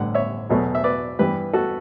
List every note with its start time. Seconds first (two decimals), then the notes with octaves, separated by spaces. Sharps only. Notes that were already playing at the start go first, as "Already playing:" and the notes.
Already playing: A1 G2 D3 F#5
0.14 C#5 E5
0.50 E2 B2 F#3 A3
0.75 E5
0.84 B4 D5
1.19 G2 E3 B3 G4 B4
1.53 F#4 A4